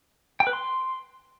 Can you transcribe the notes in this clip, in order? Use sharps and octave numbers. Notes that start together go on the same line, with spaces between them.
G5
B4
C6